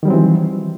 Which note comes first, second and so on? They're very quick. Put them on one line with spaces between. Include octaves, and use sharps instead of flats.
D#3 G3 F#3 C4 E3